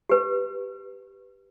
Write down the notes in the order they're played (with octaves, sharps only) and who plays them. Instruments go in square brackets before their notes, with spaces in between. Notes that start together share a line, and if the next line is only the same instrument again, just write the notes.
[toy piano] G4 B4